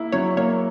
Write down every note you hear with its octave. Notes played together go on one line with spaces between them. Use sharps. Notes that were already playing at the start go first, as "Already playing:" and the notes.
Already playing: A#3 E4
F#3 C#5
A#3 C#5